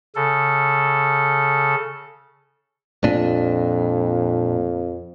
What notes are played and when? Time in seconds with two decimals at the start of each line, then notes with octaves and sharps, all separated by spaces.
0.15 C#3 A4
3.04 F2 A#2 D4